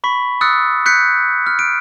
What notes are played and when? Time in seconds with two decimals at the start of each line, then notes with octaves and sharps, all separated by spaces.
0.04 B5 C#6 B6
0.41 D#6 E6 F#6 A6 C#7
0.86 F#6 G6 B6 C#7
1.46 F6
1.59 D7